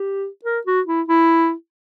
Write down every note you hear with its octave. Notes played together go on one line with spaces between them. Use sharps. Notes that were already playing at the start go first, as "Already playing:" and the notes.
Already playing: G4
A#4
F#4
E4
E4